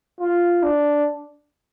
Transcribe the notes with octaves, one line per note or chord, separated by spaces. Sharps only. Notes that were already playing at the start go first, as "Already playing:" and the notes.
F4
D4